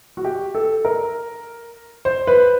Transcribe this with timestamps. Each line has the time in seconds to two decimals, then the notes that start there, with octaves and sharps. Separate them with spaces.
0.17 F#4
0.25 G4
0.55 A4
0.85 A#4
2.05 C5
2.27 B4